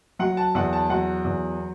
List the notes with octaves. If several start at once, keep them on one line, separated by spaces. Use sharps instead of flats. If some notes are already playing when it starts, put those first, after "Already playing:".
F#3 F#5
A5
E2 F#5
A5
F#3 F#5
E2